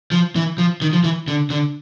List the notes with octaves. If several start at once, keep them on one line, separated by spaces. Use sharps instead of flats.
F3
E3
F3
D#3
F3
E3
D3
D3